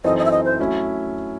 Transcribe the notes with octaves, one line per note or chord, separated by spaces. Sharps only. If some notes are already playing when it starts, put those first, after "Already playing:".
F#2 E3 C4 D#4 A4 D#5
D#5
E5
D#5
C5
F#3 A3 C#4 E4